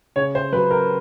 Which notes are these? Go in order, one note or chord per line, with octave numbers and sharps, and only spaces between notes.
C#3 C#5
C5
F#3 B4
A#4